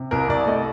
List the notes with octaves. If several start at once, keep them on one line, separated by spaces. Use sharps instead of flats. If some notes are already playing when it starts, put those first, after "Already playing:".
Already playing: C3
C2 A#4
C2 D5
A3 D#5